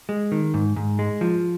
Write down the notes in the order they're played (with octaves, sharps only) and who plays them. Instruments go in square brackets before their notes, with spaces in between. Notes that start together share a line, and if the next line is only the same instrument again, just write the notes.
[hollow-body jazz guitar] G#3
D#3
G#2
G#2
G#3
F3